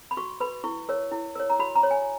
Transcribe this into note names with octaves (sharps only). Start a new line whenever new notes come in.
B5
F#4 C#6
B4 B5
E4 C#6
A#4 C#5
E4
A#4 C#5
A#5
F#4 B5
A#5
C#5
G#5